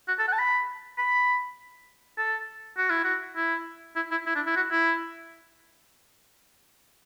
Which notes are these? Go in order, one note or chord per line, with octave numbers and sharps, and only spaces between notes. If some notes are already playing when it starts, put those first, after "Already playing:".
F#4
A4
F#5
A5
B5
B5
A4
F#4
E4
F#4
E4
E4
E4
E4
D4
E4
F#4
E4